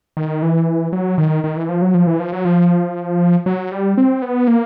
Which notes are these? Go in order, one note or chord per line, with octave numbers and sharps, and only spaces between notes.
D#3
E3
F#3
D#3
D#3
E3
F3
F#3
F3
E3
F3
F#3
F3
F#3
G3
C4
B3
A#3